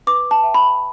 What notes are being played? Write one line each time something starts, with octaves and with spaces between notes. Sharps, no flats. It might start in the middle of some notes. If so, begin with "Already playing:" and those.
B4 D6
A5
E5 G5
B5